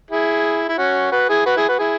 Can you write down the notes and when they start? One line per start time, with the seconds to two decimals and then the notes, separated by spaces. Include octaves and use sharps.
0.11 E4 G#4
0.69 E4
0.78 C#4 F#4
1.12 F#4 B4
1.29 E4 G#4
1.46 F#4 B4
1.56 E4 G#4
1.69 F#4 B4
1.79 E4 G#4